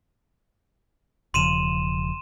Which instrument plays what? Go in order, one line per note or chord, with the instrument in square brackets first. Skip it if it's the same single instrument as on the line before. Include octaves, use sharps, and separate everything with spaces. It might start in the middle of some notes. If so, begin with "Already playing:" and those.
[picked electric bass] E1 C#3 F3 [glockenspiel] C6 D#7 E7